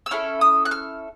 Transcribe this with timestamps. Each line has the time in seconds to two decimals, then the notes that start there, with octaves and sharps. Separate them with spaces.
0.06 E6
0.11 C#4 E4 A4 F6
0.41 D#6
0.65 F#6
0.71 F6